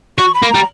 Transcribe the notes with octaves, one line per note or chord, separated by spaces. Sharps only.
F#4 C#6
B5
A#3
G3 A#5